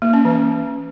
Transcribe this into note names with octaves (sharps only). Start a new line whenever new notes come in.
A#3
C#4
E3